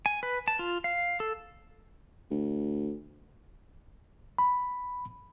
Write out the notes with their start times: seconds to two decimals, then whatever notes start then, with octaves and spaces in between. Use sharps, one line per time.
0.06 G#5
0.23 B4
0.48 A5
0.59 F4
0.84 F5
1.20 A4
2.31 D2
4.38 B5